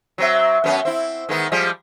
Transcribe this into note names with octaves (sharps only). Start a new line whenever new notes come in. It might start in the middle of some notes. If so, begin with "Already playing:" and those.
F#3 C4 E5
F#2 B3 C#4
C4 E4
D#3 G#3 B3
F3 G3 G#3